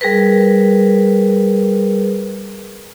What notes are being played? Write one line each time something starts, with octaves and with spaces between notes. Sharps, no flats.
G3 G#4 A#4 B4